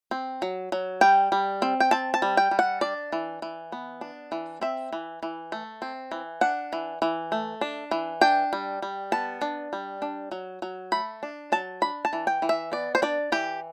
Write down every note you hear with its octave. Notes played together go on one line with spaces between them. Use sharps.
C4
F#3
F#3
G3 G5
G3
C4
G5
C4 A5
A5
G3
G5
G3
F#5
D4 D5
E3
E3
B3
D4
E3
C4 E5
E3
E3
A3
C4
E3
D4 F#5
E3
E3
A3
D4
E3
D4 G5
G3
G3
B3 A5
D4
G3
D4
F#3
F#3
A3 B5
D4
F#3 A5
D4 B5
A5
E3
G5
E3
E5
B3 D5
C5
D4 D5
E3 G4